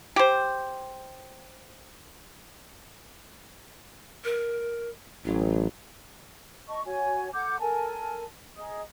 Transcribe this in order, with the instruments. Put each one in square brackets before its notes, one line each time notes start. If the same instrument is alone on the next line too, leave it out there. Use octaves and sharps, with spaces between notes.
[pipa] G4 C5
[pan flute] A#4
[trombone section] A1 [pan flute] F#3
[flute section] D#5 A5 C#6
F#4 C#5 G#5
A4 F#5 D6 G6
A4 A#4 G#5 A5
G#4 D#5 A#5 D#6